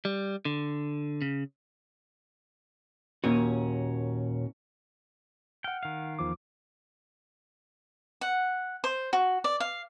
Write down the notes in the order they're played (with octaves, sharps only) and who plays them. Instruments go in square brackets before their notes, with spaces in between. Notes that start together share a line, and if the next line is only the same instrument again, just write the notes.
[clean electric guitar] G3
D3
C#3
[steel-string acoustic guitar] D#2 [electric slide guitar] A#2 C#4 F#4
[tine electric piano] F#5 F6 [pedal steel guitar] G5
[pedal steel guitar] D#3 F5
[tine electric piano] E2 F3 D6
[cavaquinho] F#5
C5
F#4
D5
F5